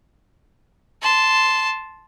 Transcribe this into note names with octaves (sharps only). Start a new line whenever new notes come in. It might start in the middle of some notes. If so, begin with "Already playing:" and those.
A5 C6